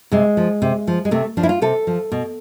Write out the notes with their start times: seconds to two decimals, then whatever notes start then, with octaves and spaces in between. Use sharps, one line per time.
0.12 C3 G#3
0.37 F3
0.62 C3
0.87 F3
1.05 G#3
1.11 C3 A3
1.37 F3 D4
1.43 E4
1.49 F4
1.62 C3 A4
1.87 F3
2.12 B2